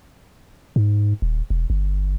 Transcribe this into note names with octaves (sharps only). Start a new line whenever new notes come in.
G#2
D#1
E1
G1